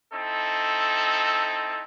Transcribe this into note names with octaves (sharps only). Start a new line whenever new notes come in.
C4 D#4 E4 A4